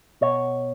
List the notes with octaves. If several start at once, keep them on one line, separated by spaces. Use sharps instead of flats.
B2 C#5